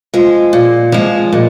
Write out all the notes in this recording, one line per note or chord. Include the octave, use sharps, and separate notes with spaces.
F3 G#3
A#2
F3 G#3
A#2